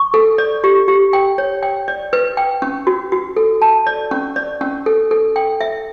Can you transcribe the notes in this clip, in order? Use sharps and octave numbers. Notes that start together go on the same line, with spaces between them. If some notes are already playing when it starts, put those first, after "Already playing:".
Already playing: C#6
A4
D5
G4
G4
G5
C#5
G5
D5
B4
G5
C#4
F#4
F#4
A4
A5
D5
C#4
D5
C#4
A4
A4
G5
E5